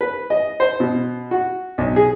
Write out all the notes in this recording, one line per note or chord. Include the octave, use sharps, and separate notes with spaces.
B4
D#5
C5
B2
F#4
B1
G#4